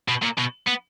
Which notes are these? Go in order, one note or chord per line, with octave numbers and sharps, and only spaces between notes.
B2
A#2
B2
B3